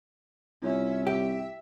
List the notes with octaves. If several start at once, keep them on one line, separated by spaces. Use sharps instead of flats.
C2 C#4 E4 F4 C#5 E5
G4 E5